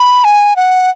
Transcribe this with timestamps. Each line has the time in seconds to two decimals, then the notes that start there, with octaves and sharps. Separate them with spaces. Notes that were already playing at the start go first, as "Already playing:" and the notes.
Already playing: B5
0.24 G#5
0.56 F#5